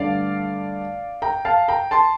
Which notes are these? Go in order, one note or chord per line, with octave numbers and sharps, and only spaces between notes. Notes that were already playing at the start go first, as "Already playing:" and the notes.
Already playing: G2 D3 A3 D5 F5
G5 A#5
F5 A5
G5 A#5
A5 C6